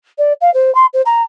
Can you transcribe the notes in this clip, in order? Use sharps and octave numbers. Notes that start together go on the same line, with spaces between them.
D5
F5
C5
C6
C5
A#5